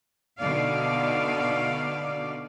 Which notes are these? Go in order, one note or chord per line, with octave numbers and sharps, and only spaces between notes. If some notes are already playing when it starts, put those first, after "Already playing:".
B2 D3 D#4 D5 F5